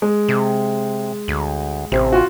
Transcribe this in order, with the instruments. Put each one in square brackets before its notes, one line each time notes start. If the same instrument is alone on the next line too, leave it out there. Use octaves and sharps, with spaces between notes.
[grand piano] G#3
[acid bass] C3
D2
[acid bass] A1 [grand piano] C3
[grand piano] F4 F#4